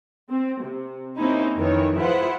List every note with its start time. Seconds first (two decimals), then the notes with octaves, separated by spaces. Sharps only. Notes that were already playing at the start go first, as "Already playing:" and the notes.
0.30 C4
0.63 C3
1.17 A#3 C4 C#4 D#4 E4
1.56 F2 D#3 E3 C#5
1.97 E4 F4 G#4 B4 C5 F#5